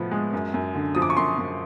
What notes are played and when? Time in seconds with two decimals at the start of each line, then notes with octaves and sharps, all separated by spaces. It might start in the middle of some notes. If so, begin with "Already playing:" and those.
Already playing: A2 F3 B3
0.11 G#3
0.33 F#2
0.54 F#2
0.75 D3
0.95 F3 D#6
1.02 D6
1.10 C#6
1.17 F#2 C6
1.39 F#2